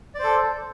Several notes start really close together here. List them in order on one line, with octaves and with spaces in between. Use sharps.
D5 C5 A4